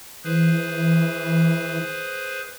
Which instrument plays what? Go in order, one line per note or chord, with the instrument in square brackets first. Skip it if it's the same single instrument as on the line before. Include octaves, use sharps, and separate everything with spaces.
[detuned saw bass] E3 [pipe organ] G#4 B4 C5